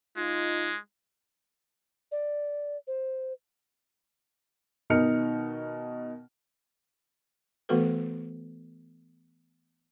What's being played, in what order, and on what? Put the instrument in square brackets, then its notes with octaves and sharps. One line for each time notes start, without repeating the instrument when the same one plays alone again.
[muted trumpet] G#3 [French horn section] D#4 F4
[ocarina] D5
C5
[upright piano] B2 D#3 D#4 F6 C#7
[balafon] E3 A3 B3 F#4 A4 B4